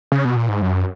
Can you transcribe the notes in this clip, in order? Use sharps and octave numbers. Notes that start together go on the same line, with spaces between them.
C#3
B2
A#2
G#2
F#2